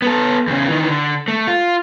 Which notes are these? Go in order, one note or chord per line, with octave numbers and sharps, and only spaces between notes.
B3 A4
E2 C#3
D#3 E3
D3
A3
F4